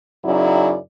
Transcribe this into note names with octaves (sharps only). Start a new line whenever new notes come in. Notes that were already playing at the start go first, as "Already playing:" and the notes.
F#2 C#3 F#3 D#4 E4 D5